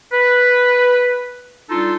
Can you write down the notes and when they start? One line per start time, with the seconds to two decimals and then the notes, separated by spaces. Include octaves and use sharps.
0.13 B4
1.70 G3 D4 D#4 F4 A4